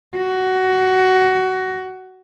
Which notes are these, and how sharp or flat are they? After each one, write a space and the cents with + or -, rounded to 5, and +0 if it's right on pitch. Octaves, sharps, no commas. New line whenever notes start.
F#4 +15